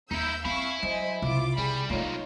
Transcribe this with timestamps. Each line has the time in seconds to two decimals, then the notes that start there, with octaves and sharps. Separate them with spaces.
0.11 D#2 D#4 E4 B5 E6 G6
0.45 C4 E5 F5 G#5 B5 C#6
0.83 F#3 C5 D#5 G#5
1.22 C2 C#3 E4 F4 D6
1.58 C3 G3 G#4 B5
1.90 B1 F#3 A3 A#3 D#4 F4 C#5